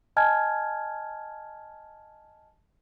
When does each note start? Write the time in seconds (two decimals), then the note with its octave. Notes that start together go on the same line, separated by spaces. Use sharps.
0.16 D#5 G#5 A5 F6 G#6